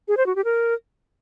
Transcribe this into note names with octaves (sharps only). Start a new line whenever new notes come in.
G#4
C5
F#4
G4
A#4